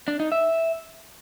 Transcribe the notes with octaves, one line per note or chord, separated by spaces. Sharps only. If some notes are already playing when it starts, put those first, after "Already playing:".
D4
D#4
E5